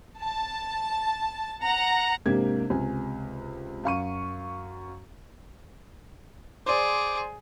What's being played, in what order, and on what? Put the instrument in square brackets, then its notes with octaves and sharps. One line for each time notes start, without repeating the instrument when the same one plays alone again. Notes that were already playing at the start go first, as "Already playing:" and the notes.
[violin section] A5
F#5 A#5
[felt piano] G#2 C3 A#3 D4 G4 G#6
C#2 C3 G#5
F#2 F5 C#6 D#7
[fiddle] G#4 [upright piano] C5 D5 [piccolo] D6